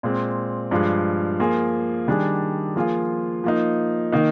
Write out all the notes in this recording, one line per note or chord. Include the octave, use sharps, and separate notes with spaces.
A#2 G#3 C4
G2 F3 G#3
F3 A#3 F4 G#4
D#3 G3 D4 G#4
F3 A#3 F4 G#4
F3 A#3 D#4
D#3 A#3 D#4